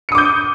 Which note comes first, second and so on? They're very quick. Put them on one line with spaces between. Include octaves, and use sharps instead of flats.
C#7 D#6 D6 G6